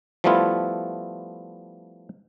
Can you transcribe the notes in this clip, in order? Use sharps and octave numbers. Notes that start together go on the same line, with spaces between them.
F3 G3 A3 B3 E4 F4